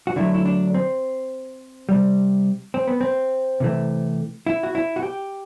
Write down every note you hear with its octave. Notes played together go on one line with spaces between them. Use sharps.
F#4
D3 F#3 A3 E4
E4
D4
C4
C3 G3
C4
B3
C4
C3 E3 A3
E4
F#4
E4
F#4
G4